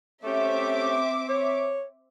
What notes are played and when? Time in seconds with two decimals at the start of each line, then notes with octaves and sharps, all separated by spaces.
0.24 A3 C4 C#4 G4 E5 D6
1.29 C#5